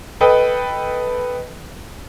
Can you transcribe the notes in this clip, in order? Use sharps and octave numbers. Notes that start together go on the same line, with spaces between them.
A4 B4 D#5 G5